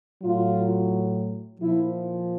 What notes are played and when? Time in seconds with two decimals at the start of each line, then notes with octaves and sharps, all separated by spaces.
0.23 A2 F#3 F4
1.60 A#2 F3 E4